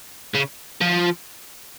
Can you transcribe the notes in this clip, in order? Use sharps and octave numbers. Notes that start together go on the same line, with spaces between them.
C#3
F3